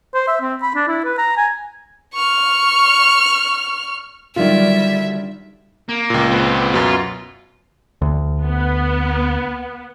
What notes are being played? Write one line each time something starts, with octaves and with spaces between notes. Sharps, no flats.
C5
E5
C4
B5
D4
E4
B4
A#5
G#5
C#6 F6
D3 D#3 F#3 G3 F4 D5 E5
A#3
C#2 A#2
C4 B4
F#2 B2 F4
D2
B3